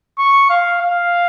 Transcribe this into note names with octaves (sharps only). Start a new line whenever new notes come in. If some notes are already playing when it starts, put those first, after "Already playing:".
C#6
F5
F5